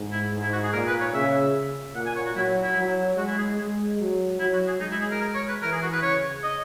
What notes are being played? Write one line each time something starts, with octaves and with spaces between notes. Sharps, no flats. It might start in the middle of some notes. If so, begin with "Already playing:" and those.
Already playing: G#2
E4
G#2
E4
F#4
G#4
A#2 A#4
B4
C#5
C#3 E5
A#2 F#5
G#5
C#5
F#4
F#3 E4
E4
F#3
G#3 F#4
E4
G#4
G#3
F#3
F#3 E4
F#4
G#4
G#3 D#4
E4
G#4
A#4
A#4
C#5
B4
E3 A#4
G#4
F#4
B4
C#3 C#5
D#5